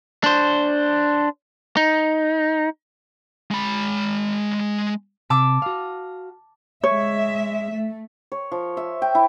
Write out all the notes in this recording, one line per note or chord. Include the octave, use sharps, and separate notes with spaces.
D4 C5
D#4
G#3 B5
C3 A5 D6 E6
F#4 F5
G#3 C#5 E5
A3
C#5
F3
E5
G5
E4